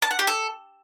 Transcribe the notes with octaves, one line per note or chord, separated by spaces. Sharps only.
A5
F#5
G4
A4